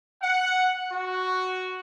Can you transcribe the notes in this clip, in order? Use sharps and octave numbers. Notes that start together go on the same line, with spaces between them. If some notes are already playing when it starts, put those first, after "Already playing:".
F#5
F#4